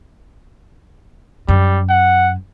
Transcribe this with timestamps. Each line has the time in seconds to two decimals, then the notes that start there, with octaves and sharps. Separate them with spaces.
1.49 F#2 G3
1.89 F#5